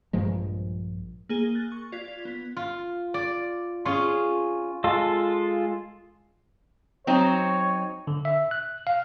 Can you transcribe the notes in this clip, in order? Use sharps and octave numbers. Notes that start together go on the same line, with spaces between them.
A#1 G2 F3 G#3
A#3 G#4 G7
F#6 A6
C#6
F4 D5 G#6 B6
B3 B6
F4
D5
C#4 F4 G#4 C#5 C6
G#3 F4 A4
F#3 C4 D#4 C#5
D3
E5
F#6
F5